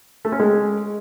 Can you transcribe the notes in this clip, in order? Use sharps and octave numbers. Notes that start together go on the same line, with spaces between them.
A3
C#4
G#3